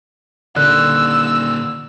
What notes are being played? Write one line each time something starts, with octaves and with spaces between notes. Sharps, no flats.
A#2 D3 D#3 A#3 E6 F#6